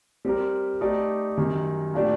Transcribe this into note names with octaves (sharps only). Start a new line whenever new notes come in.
G3 C4 G4 A#4
A3 D#4 G4 D5
F#2 D#3 G3
A#2 A3 D4 G4 D5